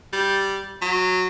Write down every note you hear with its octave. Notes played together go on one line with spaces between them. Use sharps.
G3
F#3